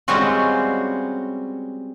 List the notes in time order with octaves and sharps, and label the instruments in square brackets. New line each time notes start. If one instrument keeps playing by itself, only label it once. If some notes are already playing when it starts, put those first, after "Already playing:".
[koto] G3 G#3 C4 C#4 F4 F#4